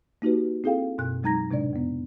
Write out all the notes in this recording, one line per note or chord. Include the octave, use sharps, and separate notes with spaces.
A#3 D#4 F#4 G4 B4
C4 E4 G#4 A4 F5 G5
F#2 B2 F#6
F#3 G#3 D#4 A#5 G#6 A#6
A2 C3 G#3 D4 D5
F2 B3